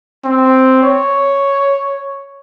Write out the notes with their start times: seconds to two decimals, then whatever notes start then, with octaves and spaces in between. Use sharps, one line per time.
0.25 C4
0.83 C#5